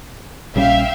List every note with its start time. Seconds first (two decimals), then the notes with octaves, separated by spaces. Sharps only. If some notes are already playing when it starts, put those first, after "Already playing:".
0.56 A#1 G3 C#4 E5 F5 G5